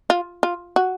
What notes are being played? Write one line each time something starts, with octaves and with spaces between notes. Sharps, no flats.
F4
F4
F#4